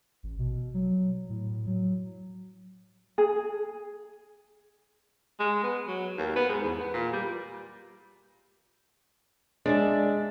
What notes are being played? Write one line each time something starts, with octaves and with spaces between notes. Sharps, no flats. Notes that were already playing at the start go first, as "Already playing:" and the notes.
A1
B2
F#3
A2
F#3
G#4
G#3
B3
F#3
D#2
B3
G#2
E2
B3
A#2
G3
G#3 D4 D5 E5